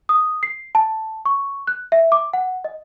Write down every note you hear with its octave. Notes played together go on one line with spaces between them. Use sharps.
D#6
C7
A5
C#6
F#6
E5
D6
F#5
D#5